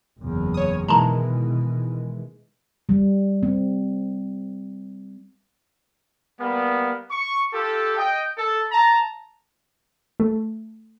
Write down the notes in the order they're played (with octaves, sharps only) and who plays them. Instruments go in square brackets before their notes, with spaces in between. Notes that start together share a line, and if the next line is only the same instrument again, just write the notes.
[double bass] F#1 E2
[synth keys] C#5 D#6
[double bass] B2 [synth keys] D#3 E3 G#3 [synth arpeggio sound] A5 A#5
[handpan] G3
C4
[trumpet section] G3 A#3 B3
C#6
F4 G4 A4
D#5 G5
A4
A5 A#5
[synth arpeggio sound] A3